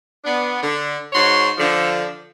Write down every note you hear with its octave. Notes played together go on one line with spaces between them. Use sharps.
B3 D4
D3
G#2 F#4 C#5 C6
D3 F3